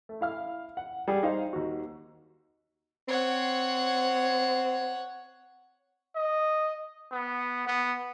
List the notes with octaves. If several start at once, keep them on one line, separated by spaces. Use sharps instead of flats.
A3
E4 F5 F6
F#5
G3 G#4
D#4 C5 F5
D#2 F#4
C4 C#5 F#5
D#5
B3
B3